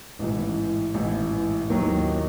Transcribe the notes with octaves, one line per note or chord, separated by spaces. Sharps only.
A1 G#2 E3
A1 G#2 E3
D#2 D#3 F#3